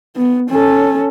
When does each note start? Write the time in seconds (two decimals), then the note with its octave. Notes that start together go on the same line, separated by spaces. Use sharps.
0.16 B3
0.50 C#4 A4